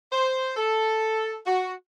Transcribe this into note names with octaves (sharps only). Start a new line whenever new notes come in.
C5
A4
F#4